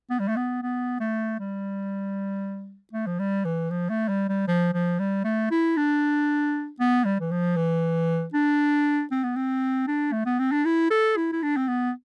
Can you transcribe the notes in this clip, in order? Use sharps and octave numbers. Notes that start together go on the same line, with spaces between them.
B3
G3
A3
B3
B3
A3
G3
A3
F3
G3
E3
F3
A3
G3
G3
F3
F3
G3
A3
E4
D4
B3
G3
E3
F3
E3
D4
C4
B3
C4
D4
A3
B3
C4
D4
E4
A4
E4
E4
D4
C4
B3